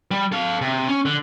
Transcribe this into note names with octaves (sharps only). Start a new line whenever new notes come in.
G3
A4 F5
C3
C#4
D3